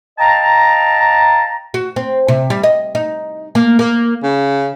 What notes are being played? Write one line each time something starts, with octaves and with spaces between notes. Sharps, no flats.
D#5 F5 G5 A5 A#5
F#4
C4
C3
G3
D#5
D#4
A#3
A#3
C#3